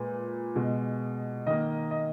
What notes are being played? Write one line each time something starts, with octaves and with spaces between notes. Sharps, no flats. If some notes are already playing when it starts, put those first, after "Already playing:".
Already playing: A#2 G#3 B4
B2 G#3
D#3 A#3 D#5
D#5